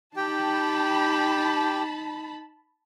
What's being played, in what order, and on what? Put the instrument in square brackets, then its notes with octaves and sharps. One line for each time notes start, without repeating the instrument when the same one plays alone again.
[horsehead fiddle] D#4 [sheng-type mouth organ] G4 G5 [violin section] A5 B5